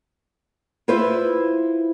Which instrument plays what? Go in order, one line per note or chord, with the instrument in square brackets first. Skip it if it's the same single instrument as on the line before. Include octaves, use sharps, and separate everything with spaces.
[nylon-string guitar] E4 F4 B4 C5 E5